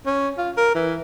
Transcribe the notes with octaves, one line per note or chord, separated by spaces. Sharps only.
C#4
F4
A#4
E3